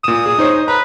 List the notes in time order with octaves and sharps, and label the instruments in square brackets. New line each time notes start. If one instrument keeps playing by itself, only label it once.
[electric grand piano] A#2 E7 [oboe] D#6
[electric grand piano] G#4
D#4 C5 C#5
[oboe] B4 [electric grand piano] A#5